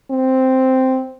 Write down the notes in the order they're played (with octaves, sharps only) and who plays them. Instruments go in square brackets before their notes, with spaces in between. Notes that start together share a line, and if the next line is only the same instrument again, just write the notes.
[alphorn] C4